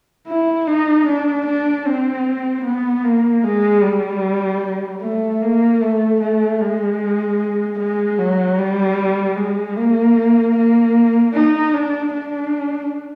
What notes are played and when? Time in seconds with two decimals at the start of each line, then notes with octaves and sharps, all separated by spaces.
0.27 E4
0.68 D#4
1.06 D4
1.47 D4
1.86 C4
2.65 B3
3.04 A#3
3.44 G#3
3.83 G3
5.01 A3
5.42 A#3
5.81 A3
6.21 A3
6.61 G#3
7.79 G#3
8.19 F#3
8.58 G3
9.36 G#3
9.76 A#3
10.56 A#3
11.34 D#4
11.74 D4
12.13 D4